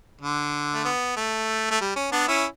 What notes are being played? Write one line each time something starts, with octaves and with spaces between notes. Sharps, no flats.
D3
A3
B3
A3
A3
G3
C#4
B3 D4
C#4 E4